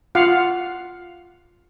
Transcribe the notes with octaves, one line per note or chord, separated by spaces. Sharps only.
F4 F5 F#5